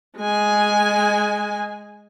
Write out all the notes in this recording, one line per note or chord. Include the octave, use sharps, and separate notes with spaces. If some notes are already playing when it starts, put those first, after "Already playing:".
G#3 G#5